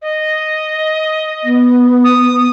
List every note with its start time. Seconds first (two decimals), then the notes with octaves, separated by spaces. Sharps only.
0.02 D#5
1.43 B3
2.04 D#6